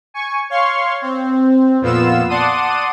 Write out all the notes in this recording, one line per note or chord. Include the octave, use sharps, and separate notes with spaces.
G#5 C#6
C#5 F5 C6 C#6
C4
F2 A#2 B3 F4 E6 E7
D5 F#5 A5 C6 D#6 D#7